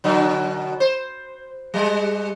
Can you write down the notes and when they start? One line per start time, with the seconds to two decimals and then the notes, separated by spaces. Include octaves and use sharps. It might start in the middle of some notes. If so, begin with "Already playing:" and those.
0.04 B2 D3 F#3
0.80 C5
1.74 G3 G#3